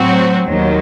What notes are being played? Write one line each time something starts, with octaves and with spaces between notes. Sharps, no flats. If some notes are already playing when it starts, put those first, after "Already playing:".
Already playing: A2 F#3 C4 F#4
D#2 D#3 F#3